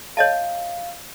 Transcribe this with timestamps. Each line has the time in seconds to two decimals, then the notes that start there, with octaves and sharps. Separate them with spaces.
0.17 C#5 D#5 F5 A5